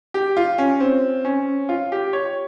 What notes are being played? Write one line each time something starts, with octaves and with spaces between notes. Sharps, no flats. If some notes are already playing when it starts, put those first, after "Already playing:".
G4
F4
C#4
C4
C#4
F4
G4
C#5